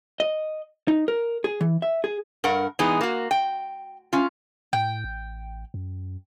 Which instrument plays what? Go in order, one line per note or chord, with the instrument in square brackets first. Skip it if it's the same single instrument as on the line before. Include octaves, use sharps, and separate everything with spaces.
[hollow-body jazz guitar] D#5
D#4
A#4
G#4
E3
E5
G#4
[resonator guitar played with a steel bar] G2 A#4 F#5
E3 G#3 B3 D#4 G#4
A#3 F#4
G5
C#4 F4
[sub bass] A2 [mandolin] G5
[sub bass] A1
F#2